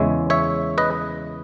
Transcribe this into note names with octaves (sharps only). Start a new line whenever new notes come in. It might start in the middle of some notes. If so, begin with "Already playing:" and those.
Already playing: E2 C#3 G#3 C#5 E5
C#5 E5
B4 D#5